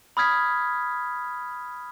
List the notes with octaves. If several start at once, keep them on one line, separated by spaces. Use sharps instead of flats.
B5 D#6 F6 G#6 B6